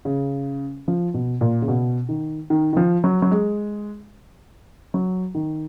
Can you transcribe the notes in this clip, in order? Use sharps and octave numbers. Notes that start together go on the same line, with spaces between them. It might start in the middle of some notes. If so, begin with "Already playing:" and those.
C#3
F3
B2
A#2
C#3
B2
D#3
D#3
D#3
F3
F#3
F#3
G#3
F#3
D#3